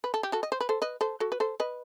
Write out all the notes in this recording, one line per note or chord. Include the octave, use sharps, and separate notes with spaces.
B4
A4
G4
F#4 A4
D#5
C5
B4
A4 C5
B4 D#5
A4 C5
F#4 A4
B4
A4 C5
B4 D#5